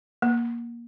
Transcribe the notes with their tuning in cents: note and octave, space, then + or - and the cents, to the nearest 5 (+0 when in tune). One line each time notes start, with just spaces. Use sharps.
A#3 +15